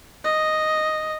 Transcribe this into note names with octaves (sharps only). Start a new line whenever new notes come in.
D#5